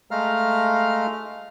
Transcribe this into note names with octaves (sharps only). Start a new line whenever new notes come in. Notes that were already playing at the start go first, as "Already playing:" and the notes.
G#3 A3 F5 A#5 F6